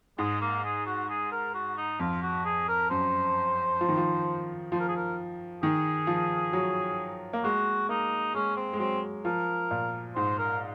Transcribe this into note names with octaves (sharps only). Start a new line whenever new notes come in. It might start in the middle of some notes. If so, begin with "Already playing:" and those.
G#2 G#3
A#3
G#4
F#4
G#4
A#4
F#4
D#4
F2 F4
F#4
G#4
A#4
F#2 C5
F3
D#3
F3
F3 C5
A#4
G#4
A#4
D#3 G#4
F3
F#3
A#3
G#3 F#4
A#3 D#4
G#3 C#4
C4
G#3
F#3 C4
F3 A#4
A#2
G#2 C5
A#4